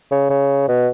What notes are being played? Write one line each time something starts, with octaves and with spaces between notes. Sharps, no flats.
C#3
C#3
B2